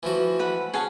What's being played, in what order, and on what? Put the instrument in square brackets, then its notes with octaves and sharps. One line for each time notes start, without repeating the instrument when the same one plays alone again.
[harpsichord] E3 F3 F#4
[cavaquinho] B4 F#5 B5
[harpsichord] C#4 [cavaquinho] G#4 F#5 A5